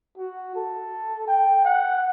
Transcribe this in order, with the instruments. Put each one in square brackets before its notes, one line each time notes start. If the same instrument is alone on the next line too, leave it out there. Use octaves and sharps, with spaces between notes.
[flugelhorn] F#4
A4
G5
F#5